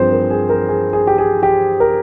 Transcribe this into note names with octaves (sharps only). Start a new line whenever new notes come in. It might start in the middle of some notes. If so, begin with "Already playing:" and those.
Already playing: G2 F3 C4 G#4 C5
A#4
G#4
A#4
G#4
G#4
G4
G#4
G4
A#4